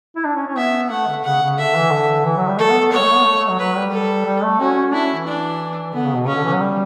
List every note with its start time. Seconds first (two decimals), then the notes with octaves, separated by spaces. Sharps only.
0.16 E4
0.25 D4
0.35 C#4
0.47 C#4
0.57 B3 E5
0.91 A3 F#5
1.08 D3
1.25 C#3 F#5
1.42 C#3
1.58 D3 E5
1.75 E3
1.91 D3
2.25 E3
2.37 F#3
2.48 G3
2.58 A3 A4
2.70 B3
2.81 B3
2.92 B3 C#5
2.99 G3
3.04 A3
3.15 B3
3.25 A3
3.37 A3
3.48 F#3
3.59 F#3 B4
3.76 G3
3.92 A4
4.26 G3
4.43 A3
4.60 C#4 F#4
4.93 D4 E4
5.04 C#4
5.15 E3
5.27 D4
5.94 D3 B3
6.05 C#3
6.16 B2
6.27 C#3 C#4
6.35 D3
6.44 E3
6.53 F#3
6.60 G3